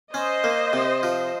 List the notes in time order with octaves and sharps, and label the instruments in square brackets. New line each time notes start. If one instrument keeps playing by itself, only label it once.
[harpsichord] C#4 [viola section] C5 D#5
[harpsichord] A#3
C3
F3